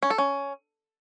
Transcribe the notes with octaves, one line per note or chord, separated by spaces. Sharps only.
C#4
A4
C#4